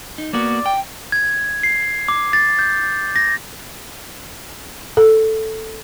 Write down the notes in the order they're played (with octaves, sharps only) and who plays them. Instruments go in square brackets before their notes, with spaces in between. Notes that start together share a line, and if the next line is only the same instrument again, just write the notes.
[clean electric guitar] D#4
[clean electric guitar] A#3 B3 F#4 [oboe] D5
[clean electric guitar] G5
[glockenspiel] G#6
C7
D6
A6
G6
A#6
[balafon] A4